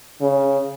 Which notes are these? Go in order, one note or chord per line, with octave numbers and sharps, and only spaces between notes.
C#3